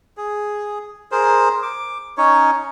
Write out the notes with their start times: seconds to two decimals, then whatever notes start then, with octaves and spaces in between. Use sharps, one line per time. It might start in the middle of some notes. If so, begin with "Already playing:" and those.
0.17 G#4
1.12 G#4 A#4 C5
1.63 D6
2.18 C#4 D#4 C#5